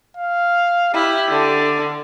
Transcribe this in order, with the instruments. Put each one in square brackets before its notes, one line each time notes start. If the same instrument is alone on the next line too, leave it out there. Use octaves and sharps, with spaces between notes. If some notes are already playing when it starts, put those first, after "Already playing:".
[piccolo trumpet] F5
[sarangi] E4 [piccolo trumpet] G4
[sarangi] D3